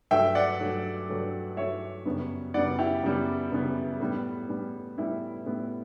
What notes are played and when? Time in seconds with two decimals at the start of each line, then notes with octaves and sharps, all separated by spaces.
0.11 G2 F#3 A3 E5 G5
0.35 D5 F#5
0.60 G2 F#3 A3
1.08 G2 F#3 A3
1.57 G2 F#3 A3 C#5 E5
2.05 F#2 C#3 G3 B3
2.54 F#2 C#3 G3 B3 D5 F#5
2.79 E4 G4
3.03 F#2 C#3 G3 B3
3.52 F#2 C#3 G3 B3
4.00 A2 G3 B3
4.49 A2 G3 B3
4.98 A2 G3 B3 E4
5.46 A2 G3 B3